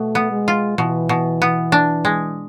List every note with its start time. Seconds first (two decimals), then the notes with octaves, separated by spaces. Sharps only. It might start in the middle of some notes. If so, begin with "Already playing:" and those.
Already playing: B2 A3
0.15 B3
0.31 G#3
0.48 F4
0.78 B2 E3
1.09 B2
1.42 B3
1.72 D4
2.05 G#3